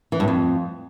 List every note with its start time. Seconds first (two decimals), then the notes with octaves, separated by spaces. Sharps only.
0.12 E3
0.20 G2
0.28 F2